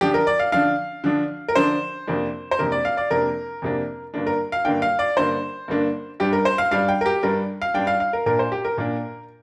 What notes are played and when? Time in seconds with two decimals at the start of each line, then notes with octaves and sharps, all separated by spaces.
0.01 D3 F3 D4 G4
0.14 A#4
0.27 D5
0.40 F5
0.52 D3 F3 D4 F5
1.04 D3 F3 D4
1.48 A#4
1.56 D3 F3 D4 C5
2.07 F2 C3 A#3 D4
2.51 C5
2.59 F2 C3 A#3 D4 A#4
2.72 D5
2.85 F5
2.97 D5
3.10 F2 C3 A#3 D4 A#4
3.62 F2 C3 A#3 D4
4.14 G2 D3 A#3 D4
4.27 A#4
4.52 F5
4.65 G2 D3 A#3 D4 G5
4.82 F5
4.99 D5
5.17 G2 D3 A#3 D4 C5
5.68 G2 D3 A#3 D4
6.20 G2 G3 D4 G4
6.33 A#4
6.45 C5
6.58 F5
6.71 G2 G3 D4 F5
6.88 G5
7.01 A#4
7.06 G4
7.23 G2 G3 D4 A#4
7.62 F5
7.74 G2 G3 D4 G5
7.87 F5
8.00 F5
8.13 A#4
8.26 A#2 A#3 D4 A#4
8.39 C5
8.52 G4
8.65 A#4
8.78 A#2 A#3 D4